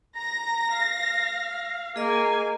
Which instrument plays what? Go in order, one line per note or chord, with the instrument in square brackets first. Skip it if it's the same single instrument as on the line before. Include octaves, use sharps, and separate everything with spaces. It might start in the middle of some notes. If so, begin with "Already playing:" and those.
[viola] A#5 [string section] A#6
[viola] F5
[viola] A#3 G#5 [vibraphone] G#4 D#5